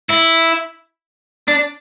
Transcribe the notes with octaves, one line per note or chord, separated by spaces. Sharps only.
E4
D4